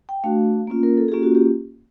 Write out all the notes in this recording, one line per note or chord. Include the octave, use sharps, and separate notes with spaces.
G5
A3 D4 F#4 F5
A#3 C#4 F4
A#4
A4
G#4
A#3 C#4 F4 G4
F#4
G4